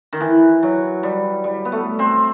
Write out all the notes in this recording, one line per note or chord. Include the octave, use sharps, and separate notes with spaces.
D#3
E3
F#3
G3
G3
B3
A3
C4